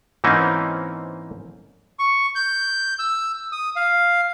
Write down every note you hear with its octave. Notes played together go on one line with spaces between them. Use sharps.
G#2 E3 A#3 C4 C#4 D#4
C#6
G6
E6
D#6
F5